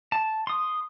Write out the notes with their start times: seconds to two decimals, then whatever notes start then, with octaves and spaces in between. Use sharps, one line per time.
0.12 A5
0.47 C6 D#6